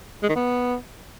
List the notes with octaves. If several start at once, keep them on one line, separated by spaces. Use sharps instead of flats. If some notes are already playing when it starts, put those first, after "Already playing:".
G#3
D#3
B3